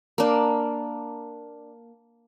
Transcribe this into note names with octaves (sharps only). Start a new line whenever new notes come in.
A#3 D4